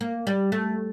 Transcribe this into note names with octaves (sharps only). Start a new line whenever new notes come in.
A#3
G3
A3